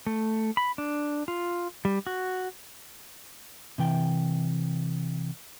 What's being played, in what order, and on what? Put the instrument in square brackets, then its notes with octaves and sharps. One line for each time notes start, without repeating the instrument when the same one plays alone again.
[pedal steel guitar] A3
B5
D4
F4
G3
F#4
[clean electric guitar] C3 E3 G5